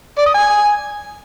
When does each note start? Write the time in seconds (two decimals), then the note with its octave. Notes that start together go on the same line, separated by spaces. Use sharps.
0.18 D5
0.26 D#6
0.34 G#5